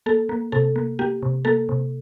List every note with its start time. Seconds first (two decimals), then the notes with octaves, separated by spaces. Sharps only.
0.06 A#3 A4
0.29 A#3
0.52 C3 A4
0.76 A#3
0.99 A#3 G4
1.23 C3
1.45 A#3 A4
1.69 C3